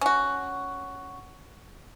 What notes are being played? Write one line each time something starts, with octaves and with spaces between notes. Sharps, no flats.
C#4 F#4